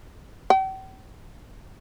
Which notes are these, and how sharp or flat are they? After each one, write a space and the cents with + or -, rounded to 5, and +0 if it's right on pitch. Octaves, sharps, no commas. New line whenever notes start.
G5 -45